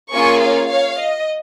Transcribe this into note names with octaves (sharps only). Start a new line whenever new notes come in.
A#3 C#4 F4 G#4 G#5 C#6
C#5 F5
C#5 F5
D#5